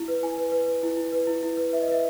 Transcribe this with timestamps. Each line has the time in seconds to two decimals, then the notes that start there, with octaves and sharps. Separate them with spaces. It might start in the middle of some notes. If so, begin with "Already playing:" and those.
Already playing: E4
0.08 B4
0.23 E4 G#5
0.38 B4
0.52 B4
0.67 B4
0.83 E4
0.97 E4
1.12 B4
1.27 E4
1.43 E4
1.57 B4
1.73 B4 E5
1.82 D#5
1.88 B4 E5